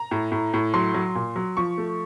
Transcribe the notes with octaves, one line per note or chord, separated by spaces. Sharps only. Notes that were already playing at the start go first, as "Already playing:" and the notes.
Already playing: A#5
A2
A2
A2
F#3 C6
F#3
A#2
F#3
F3 C#6
A3